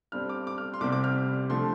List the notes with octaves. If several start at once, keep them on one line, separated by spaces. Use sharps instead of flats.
G2 G3 C4 F6
D6
D6
F6
C6
C2 C3 G3 C4 D6
D6
F6
D3 F3 A3 C6